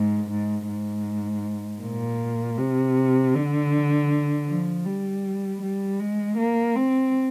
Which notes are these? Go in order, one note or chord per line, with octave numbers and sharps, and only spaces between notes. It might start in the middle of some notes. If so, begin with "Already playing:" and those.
Already playing: G#2
G#2
G#2
A#2
C3
D3
F3
G3
G3
G#3
A#3
C4